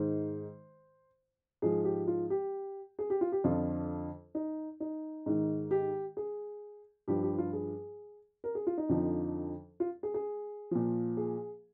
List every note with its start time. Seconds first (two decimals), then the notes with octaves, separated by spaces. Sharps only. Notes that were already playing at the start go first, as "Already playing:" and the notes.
Already playing: G#2 D#3 C5
1.62 G#2 F3 G#4
1.85 G4
2.07 F4
2.30 G4
2.99 G#4
3.10 G4
3.21 F4
3.32 G4
3.44 F2 D3 F3 F4
4.35 D#4
4.80 D#4
5.26 G#2 D#3
5.71 G4
6.17 G#4
7.08 G2 F3 G4
7.23 G4
7.38 F4
7.53 G#4
8.44 A#4
8.55 G#4
8.67 F4
8.78 D#4
8.89 F2 D3 F3
9.80 F4
10.03 G#4
10.14 G#4
10.71 A#2 F3
11.17 G#4